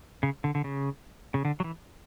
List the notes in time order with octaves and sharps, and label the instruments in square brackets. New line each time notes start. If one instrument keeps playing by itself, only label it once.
[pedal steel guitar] C#3
D3
D3
C#3
C#3
D3
F#3
E3